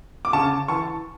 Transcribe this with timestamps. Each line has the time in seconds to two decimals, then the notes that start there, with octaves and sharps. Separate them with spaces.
0.25 D6
0.33 C#3 A5 C#6
0.68 E3 A5 C#6